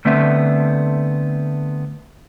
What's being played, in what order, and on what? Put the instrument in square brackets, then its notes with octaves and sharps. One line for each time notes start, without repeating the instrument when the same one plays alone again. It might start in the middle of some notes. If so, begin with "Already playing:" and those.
[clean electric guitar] D3 A3 B3 C4 E5